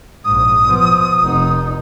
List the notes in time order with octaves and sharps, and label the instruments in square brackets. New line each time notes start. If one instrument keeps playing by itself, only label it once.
[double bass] A#1 G#2 [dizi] D#6
[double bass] B2 F3
F1 D#4